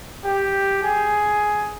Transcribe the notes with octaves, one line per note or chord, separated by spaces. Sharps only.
G4
G#4